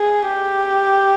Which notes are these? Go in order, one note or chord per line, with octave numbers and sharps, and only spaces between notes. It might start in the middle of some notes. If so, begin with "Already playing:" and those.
Already playing: G#4
G4